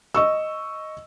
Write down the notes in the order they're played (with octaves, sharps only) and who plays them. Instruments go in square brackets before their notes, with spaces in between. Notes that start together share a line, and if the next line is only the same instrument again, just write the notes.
[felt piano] D#5 C#6 E6